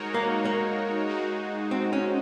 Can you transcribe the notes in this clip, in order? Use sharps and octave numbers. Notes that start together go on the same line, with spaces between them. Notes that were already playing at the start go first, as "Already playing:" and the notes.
Already playing: G#3 D#4 F#4 A#4 C#5
A#3
A#3
G#3 D#4 F#4
C4
C#4